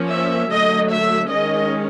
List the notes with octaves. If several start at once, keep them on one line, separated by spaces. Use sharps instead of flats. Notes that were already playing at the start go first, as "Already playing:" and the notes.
Already playing: F3 A#3 C#4
E5
D3 F#3 A3 D#5
E5
D#3 G#3 C#4 D#5